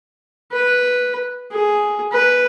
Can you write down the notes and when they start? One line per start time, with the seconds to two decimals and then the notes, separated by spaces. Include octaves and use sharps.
0.52 B4
1.51 G#4
2.12 B4